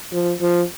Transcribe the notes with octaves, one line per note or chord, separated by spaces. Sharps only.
F3
F3